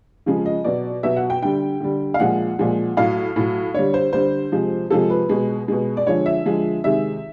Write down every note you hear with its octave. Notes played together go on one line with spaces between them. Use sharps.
C#3 F3 G#3
D#5
B2 F#3 D5
B2 F#3 E5
F#5
G5
D3 G3 G5
D3 G3
F5
A#2 F3 G#3 F#5
A#2 F3 G#3
A2 F#3 F5
A2 F#3
D3 G3 C#5
C5
D3 G3 C5
C3 F3 G#3
C3 F3 G#3 A4
B4
B2 G#3
B2 G#3
D5
D3 F3 G#3 C#5
E5
D3 F3 G#3
C3 D#3 G#3 E5